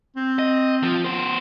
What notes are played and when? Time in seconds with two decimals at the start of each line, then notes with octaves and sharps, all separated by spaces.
0.16 C4
0.39 D#5
0.83 F3
1.05 B3 C5